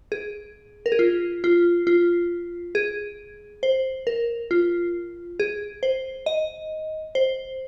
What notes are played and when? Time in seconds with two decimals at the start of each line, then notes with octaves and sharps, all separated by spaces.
0.12 G#4
0.86 A#4
0.92 G#4
0.99 F4
1.44 F4
1.87 F4
2.75 G#4
3.63 C5
4.07 A#4
4.51 F4
5.40 G#4
5.83 C5
6.26 D#5
7.15 C5